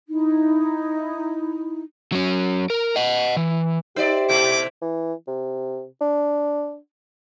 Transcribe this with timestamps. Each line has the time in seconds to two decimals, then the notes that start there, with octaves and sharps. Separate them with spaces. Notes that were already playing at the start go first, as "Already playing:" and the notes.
0.08 D#4 E4
2.12 F#3 C#4
2.70 A#4
2.96 D#5 F#5
3.37 E3
3.96 D#4 G4 C5 D5 E5
4.29 B2 A3 E4 D6
4.82 E3
5.27 C3
6.01 D4